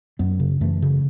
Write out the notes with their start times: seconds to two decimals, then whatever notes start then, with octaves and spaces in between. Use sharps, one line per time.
0.19 F#2 F#3 B3
0.40 C#3
0.61 F#2 E3 A3
0.82 C#3